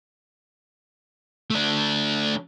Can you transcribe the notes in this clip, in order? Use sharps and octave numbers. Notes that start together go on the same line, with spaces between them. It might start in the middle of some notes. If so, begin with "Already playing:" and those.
A3 D4